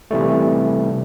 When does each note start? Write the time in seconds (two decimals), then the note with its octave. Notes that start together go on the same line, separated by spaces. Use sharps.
0.11 C3 E3 G3 A3